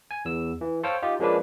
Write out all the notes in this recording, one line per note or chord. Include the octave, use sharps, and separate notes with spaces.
G#5
E2 E6
E3
A4 C5 C#5 F5 G5
D#4 F4 G4
F3 G#3 A#3 C#4 D4 B4